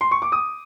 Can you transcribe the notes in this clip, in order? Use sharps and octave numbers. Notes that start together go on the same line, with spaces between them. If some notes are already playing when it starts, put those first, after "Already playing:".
C6
C#6
D6
D#6